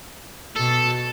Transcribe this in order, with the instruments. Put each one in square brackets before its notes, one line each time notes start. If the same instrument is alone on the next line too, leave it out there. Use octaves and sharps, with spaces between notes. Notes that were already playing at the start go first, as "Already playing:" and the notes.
[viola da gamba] B2 [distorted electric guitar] A4